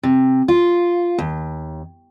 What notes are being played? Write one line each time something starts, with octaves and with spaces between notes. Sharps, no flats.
C3
F4
D#2